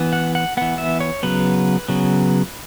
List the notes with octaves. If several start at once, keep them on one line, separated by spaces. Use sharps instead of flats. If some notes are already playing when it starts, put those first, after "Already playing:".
Already playing: E3 B3
F#5
F#5
E3 B3 F#5
E5
C#5
C#3 F#3 B3 B4
C#3 F#3 B3